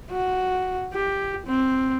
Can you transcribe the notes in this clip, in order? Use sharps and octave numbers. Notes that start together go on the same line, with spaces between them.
F#4
G4
C4